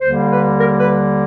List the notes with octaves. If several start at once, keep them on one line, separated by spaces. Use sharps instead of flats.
D#2 D3 G3 A#3 C5
B4
A#4
B4